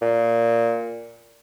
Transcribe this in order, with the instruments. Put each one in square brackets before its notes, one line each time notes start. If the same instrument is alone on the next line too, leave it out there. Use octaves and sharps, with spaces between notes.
[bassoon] A#2